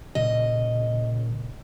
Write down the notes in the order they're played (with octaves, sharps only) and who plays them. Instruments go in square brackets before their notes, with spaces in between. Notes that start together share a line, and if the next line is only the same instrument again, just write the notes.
[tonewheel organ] A#2 C#3 [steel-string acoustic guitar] D#5